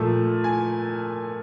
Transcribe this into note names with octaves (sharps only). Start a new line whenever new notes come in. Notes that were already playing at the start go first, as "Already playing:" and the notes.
Already playing: A#2 F3 A3 A5
G#5